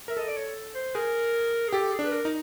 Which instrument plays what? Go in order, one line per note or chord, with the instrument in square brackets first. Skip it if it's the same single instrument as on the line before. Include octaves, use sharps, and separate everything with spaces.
[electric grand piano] A#4 [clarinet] E5
[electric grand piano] A4 [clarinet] D#5
[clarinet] D5
C#5
C5
[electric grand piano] G#4 [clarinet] A#4
[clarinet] G#4
[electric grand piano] G4 [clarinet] A4
[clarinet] G#4
[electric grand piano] D4
[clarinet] B4
A#4
[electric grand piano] D#4